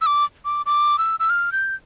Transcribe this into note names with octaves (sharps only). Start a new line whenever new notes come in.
E6
D6
D6
D6
E6
E6
F6
G6